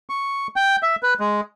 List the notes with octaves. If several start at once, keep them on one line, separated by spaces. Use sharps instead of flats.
C#6
G5
E5
B4
G#3